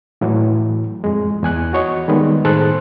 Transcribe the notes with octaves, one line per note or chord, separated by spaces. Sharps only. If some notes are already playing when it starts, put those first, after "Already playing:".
A2 E3 F#3
F2 G#3
E2 G#5 F#6
F#4 C#5 D#5
D#3 G3 G#3 B3
A2 D#3 G#4 A4 C5 F#6